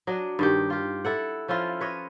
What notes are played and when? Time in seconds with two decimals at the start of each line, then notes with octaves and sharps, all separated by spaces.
0.07 F#3 D4 D#5
0.39 G2 D#3 G4
0.70 F4 G4
1.05 E4 A4 F#5
1.48 F3 C#4 E4 F4
1.80 B4 C#5 D#5